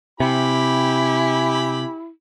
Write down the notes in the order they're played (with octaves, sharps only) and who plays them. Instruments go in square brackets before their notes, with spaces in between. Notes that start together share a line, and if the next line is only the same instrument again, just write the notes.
[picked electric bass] C3 [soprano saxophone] E4 [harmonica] G4 G#5 B5